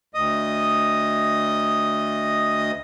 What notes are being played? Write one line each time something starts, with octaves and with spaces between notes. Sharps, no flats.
D2 D#5 D#6